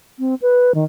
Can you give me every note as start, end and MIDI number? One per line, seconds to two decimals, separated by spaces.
0.19 0.35 60
0.42 0.72 71
0.75 0.84 51